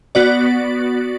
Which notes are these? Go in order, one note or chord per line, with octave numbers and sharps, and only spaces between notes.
B3 F#4 D5